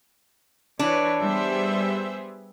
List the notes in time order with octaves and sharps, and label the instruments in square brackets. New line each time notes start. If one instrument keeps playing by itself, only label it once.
[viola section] E3 B4 C#5 [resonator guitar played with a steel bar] D4
[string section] G3 B3 G#4 [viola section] C5 E5